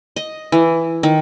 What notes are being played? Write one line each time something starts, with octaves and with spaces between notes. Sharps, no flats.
D#5
E3
D#3